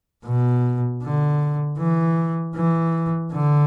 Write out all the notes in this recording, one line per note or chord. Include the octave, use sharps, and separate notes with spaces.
B2
D3
E3
E3
D3